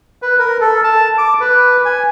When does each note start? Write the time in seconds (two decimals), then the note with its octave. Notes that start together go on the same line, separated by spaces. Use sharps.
0.22 B4
0.39 A#4
0.61 A4
0.84 A5
1.18 D6
1.41 B4
1.85 G#5